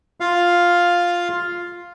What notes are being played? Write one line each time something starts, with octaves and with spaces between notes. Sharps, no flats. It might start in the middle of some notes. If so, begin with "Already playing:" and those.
F4 F5